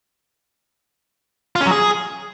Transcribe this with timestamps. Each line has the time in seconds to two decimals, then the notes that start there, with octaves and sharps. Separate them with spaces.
1.56 F4
1.61 C#4
1.66 F#3
1.71 G#4